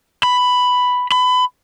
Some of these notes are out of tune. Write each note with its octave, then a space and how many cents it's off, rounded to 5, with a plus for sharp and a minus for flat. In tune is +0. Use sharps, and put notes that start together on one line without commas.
B5 +5
B5 +25